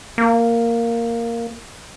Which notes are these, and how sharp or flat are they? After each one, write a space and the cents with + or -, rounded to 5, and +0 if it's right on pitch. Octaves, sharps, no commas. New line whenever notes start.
A#3 -5